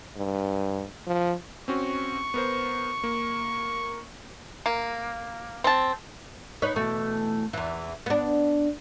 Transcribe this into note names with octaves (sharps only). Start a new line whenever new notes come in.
G2
F3
C4 C#4 F#4 C#6
B3 A#4 C5
A#3
A#3
C4 A5
D#4 B4 C#5
B2 E3 A3
E2 E3
B3 D4